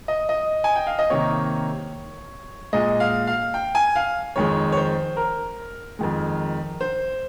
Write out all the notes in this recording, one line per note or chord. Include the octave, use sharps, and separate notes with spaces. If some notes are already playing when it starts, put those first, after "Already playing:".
D#5
D#5
G#5
G5
F5
D#5
C3 D#3 A#3 C#5
A#2 G#3 D#5
F5
F5
G5
G#5
F5
F2 D#3 G#3 C#5
C#5
C5
A#4
F2 D#3 G#3
C5